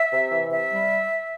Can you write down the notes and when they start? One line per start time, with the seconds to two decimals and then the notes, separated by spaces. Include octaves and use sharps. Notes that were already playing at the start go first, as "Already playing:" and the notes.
Already playing: E5
0.11 C3
0.31 E3
0.50 C3 E5
0.70 G3